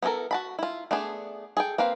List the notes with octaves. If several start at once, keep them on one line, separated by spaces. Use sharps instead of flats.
B3 E4 F#4 A4 A#4
F#4 A5 B5
E4 F4
A3 B3 D4 G#4
G#4 A4 G5
A#3 C4 B4 F5